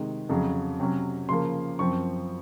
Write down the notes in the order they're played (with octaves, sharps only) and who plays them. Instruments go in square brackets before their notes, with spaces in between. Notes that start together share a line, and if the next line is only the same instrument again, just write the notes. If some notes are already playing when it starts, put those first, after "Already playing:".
Already playing: [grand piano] C3 D#3 G#3
F2 C#3 F#3
C3 F#3 C#4
C#3 F3 A#3 C6
F#2 F3 C4 C#6